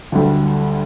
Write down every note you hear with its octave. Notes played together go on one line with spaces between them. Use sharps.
D2 D3 G3